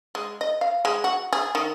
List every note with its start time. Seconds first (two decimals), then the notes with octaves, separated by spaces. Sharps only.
0.15 G#3
0.41 D#5
0.61 F5
0.85 G#3
1.04 F#4
1.33 G#4
1.55 D#3